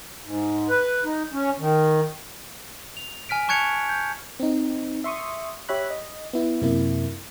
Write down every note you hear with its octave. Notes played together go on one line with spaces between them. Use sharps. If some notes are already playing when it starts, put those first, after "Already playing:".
G#2
B4
D#4
C#4
D#3
F7
G#5 F6 B6 D7
A5 C#6 F#6 G#6 C#7 F7
G6
C4 D#4
E5 C6 C#6 D#6
G4 C#5 E5 B5 F#6
D#5
B3 E4
F#2 C3 A#3 E4